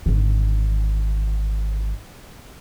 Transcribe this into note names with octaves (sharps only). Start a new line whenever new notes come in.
G#1 D3